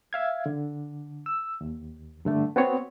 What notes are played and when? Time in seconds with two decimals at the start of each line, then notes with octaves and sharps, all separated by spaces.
0.13 E5 F5 G#6
0.46 D3
1.26 E6
1.61 D#2
2.25 G2 D3 A3
2.56 B3 C4 F#4 C#5